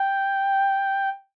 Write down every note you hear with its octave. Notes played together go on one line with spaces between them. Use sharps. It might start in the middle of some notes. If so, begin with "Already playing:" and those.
Already playing: G5